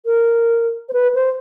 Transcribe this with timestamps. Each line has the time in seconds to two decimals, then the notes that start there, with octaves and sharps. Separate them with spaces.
0.06 A#4
0.89 C5
0.93 B4
1.15 C5